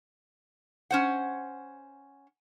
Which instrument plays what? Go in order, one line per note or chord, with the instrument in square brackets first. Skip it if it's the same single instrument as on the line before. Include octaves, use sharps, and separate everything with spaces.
[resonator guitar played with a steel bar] C#4 C5 F#5